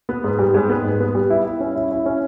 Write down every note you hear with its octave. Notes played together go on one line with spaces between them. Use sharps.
B3
G#2
G3
G#2
B3
G#2
B3
G3
E4
E4
C#4
E4
E4
C#4